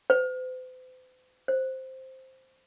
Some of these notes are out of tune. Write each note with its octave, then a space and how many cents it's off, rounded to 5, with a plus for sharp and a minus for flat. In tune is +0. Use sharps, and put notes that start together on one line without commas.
C5 -45
C5 +0